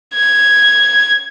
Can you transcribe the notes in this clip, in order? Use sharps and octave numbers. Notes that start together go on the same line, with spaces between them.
G#6